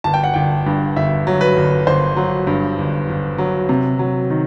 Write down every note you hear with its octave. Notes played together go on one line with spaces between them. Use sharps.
G1 A5
G5
F#5
G1 G5
G2
G1 E5
F#3
B4
G1
G1 C5
F#3
G2
G1
G1
F#3
C3
F#3
D#3